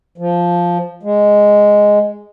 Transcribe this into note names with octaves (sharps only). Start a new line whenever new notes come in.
F3
G#3